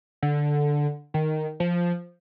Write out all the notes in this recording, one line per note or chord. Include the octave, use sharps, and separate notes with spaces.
D3
D#3
F3